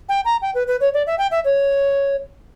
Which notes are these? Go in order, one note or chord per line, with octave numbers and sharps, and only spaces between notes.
G5
A#5
G5
B4
B4
C#5
D5
E5
G5
E5
C#5